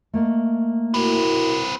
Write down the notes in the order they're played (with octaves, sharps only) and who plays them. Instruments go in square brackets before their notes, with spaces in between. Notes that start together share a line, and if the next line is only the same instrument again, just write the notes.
[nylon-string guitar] A3 A#3 D#5
[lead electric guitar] C4 B4 [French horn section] E4 F#4 A#4